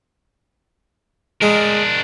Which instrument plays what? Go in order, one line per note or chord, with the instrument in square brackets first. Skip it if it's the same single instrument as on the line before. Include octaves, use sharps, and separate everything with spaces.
[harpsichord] G#3 [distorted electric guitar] D4 A#4